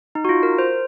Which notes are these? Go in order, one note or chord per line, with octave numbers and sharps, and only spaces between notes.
D#4
F#4
F4
A#4
C5